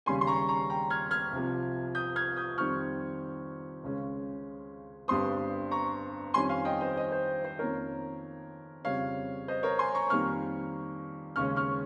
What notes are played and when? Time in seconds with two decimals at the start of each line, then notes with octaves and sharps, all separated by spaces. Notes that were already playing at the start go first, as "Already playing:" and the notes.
0.06 D#2 C#3 G3 C#4 G#5 C6
0.21 C6
0.27 A#5 C#6
0.49 A#5 C#6
0.70 G5 A#5
0.90 F6 G#6
1.11 F6 G#6
1.32 C2 C3 F3
1.95 D#6 G6
2.16 F6 G#6
2.37 D#6 G6
2.58 F2 D#3 G3 C4 C#6 F6
3.84 C#2 C#3 G#3 C#4
5.08 G1 G2 G3 C4 C6 D#6
5.71 A#5 C#6
6.34 F2 D#3 G3 C#4 G#5 C6
6.49 F5 G#5
6.65 D#5 G5
6.81 C5 D#5
6.97 C5 D#5
7.12 C5
7.45 C5
7.59 F2 D#3 A#3 C#4 A#4 C#5
8.85 F2 C#3 G3 C#5 F5
9.48 C5 D#5
9.63 A#4 C#5
9.79 G#5 C6
9.95 A#5 C#6
10.10 F2 D#3 G3 A#3 C#6 F6
11.36 D#2 C#3 G#3 C#4 C#6 F6
11.56 C#6 F6